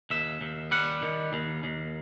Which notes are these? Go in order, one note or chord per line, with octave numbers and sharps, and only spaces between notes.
D#2 E5
D#2
G3 F#5
D#3
D#2
D#2